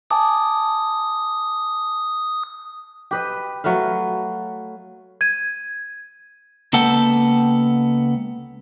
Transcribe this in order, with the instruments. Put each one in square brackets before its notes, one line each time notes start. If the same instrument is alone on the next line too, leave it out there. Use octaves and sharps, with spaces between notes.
[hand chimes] G#5 A5 D6 [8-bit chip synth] D#6
[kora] G4 B4 D#5
F#3 A3 B4 F5
[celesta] G#6 D#7
[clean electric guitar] C#2 A#3 B3 A4 F#5 G5